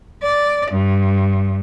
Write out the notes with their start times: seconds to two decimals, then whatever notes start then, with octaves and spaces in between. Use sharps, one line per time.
0.23 D5
0.72 G2